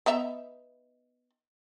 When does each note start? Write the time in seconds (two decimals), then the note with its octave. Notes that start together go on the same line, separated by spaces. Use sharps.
0.06 B3 D#4 E5